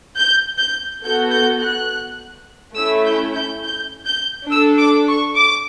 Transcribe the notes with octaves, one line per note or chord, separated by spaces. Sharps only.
G6
G6
B3 F#4 A4 G6
G6
F#6
A3 C#4 E4 E6
G6
G6
G6
G6
D4 A4 E6
D6
C#6
D6